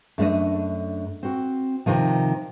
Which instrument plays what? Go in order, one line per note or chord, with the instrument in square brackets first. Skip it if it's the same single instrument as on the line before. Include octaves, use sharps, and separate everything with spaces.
[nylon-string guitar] F#2 A3 D4 D#5
C4 F#4
C3 D#3 F3